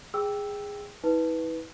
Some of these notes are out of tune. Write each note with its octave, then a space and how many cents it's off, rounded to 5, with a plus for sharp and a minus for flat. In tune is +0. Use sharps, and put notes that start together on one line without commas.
G#4 -15 G5 +0 E6 +0
E4 -40 B4 +0